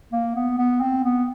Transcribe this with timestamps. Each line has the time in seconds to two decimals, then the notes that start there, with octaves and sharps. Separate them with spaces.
0.12 A#3
0.36 B3
0.58 B3
0.81 C4
1.04 B3